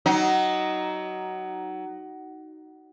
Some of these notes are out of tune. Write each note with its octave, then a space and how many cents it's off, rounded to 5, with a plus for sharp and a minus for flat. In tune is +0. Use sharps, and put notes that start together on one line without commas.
F#3 +20 D#4 +0